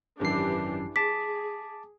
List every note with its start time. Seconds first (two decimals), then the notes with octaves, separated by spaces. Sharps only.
0.20 G#1 F#2 E3 D4 G4 C7
0.96 G#4 A5 D6 B6